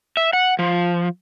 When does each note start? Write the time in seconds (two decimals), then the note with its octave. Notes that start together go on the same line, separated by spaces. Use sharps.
0.17 E5
0.33 F#5
0.59 F3